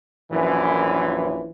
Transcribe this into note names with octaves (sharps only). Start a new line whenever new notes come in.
A#1 F#2 E3